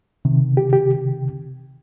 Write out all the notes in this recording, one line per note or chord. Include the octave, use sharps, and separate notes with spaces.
C3 D#3
G4
G4